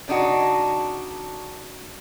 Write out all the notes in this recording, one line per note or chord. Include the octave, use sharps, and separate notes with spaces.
C#3 D4 D#4 F#4